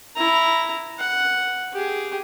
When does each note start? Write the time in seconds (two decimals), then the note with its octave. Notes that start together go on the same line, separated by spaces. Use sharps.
0.16 E4 A#5
0.99 F#5
1.73 G4 G#4